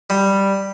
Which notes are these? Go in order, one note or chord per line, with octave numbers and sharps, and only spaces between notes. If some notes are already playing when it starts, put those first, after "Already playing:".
G3